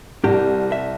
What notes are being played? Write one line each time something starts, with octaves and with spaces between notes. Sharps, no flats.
C2 G4
E5